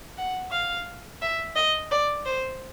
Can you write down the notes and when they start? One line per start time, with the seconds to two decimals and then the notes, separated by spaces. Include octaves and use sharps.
0.17 F#5
0.52 F5
1.22 E5
1.56 D#5
1.91 D5
2.26 C5